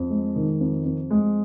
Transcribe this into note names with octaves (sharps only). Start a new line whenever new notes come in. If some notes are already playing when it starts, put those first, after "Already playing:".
Already playing: F2
G#3
D#3
F2
F2
G#3